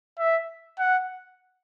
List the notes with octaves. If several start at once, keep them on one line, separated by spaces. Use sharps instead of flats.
E5
F#5